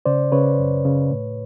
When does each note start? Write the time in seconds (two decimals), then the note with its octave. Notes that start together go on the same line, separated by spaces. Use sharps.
0.06 C#3 C5 D5
0.32 C#3 B4 C#5
0.58 F#2
0.85 C#3
1.11 A2